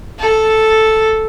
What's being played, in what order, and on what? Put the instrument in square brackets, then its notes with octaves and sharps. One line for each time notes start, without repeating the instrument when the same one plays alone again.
[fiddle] A4